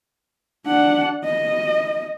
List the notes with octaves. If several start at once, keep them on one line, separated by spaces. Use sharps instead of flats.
D4 F#5
D#5